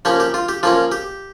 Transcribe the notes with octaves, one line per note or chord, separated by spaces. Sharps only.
F3 A#3 C#4 G4
G4
F4
G4
F3 A#3 C#4 F4
G4